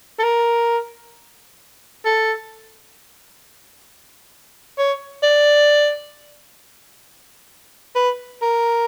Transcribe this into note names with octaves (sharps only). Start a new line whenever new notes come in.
A4
A#4
A4
C#5
D5
B4
A#4